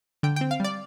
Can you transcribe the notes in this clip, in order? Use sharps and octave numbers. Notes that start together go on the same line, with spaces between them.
D3 G5
C4 G5
F5
G3 D5